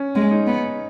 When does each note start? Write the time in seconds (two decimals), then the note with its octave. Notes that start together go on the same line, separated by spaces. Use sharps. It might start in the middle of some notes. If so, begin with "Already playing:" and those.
Already playing: C#4
0.16 G#3 C#4
0.31 D#4
0.47 B3